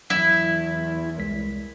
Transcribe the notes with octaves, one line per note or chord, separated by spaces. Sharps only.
E2 F#3 E4 B6
C2 G#3 B6